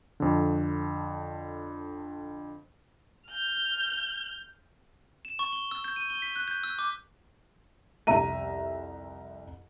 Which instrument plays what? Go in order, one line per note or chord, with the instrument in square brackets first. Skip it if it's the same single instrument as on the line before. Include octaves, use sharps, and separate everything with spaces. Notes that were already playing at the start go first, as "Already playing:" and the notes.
[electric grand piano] F2 D3
[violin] F6 G6
[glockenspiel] E7
C#6
G7
E6
G6
D#7
G7
B6
F#6
G6
E6
D6
[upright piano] C2 F2 E5 A#5 D#7